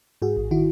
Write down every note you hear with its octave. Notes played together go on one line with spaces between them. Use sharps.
G#2 F#4 G#4
A1
D#3 E4 F#4